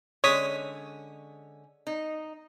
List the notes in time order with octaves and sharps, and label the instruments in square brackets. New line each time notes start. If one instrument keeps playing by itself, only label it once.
[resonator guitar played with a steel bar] D3 G#3 C#4 [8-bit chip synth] C#5 D#6 B6
[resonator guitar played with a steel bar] D#4